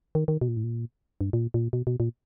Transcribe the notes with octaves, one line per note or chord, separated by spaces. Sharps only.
D#3
D#3
B2
A#2
A2
A#2
G2
A#2
A#2
B2
B2
A#2